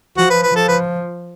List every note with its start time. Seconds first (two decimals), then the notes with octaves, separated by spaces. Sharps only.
0.17 F3 F#4
0.30 B4
0.43 B4
0.55 F3 A4
0.68 B4